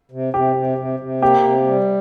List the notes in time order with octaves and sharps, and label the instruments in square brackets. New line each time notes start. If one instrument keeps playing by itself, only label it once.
[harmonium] C3
[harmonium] C3 [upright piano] G4
[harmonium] C3
C3
C3
[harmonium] A#3 [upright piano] G4
[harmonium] C3
G3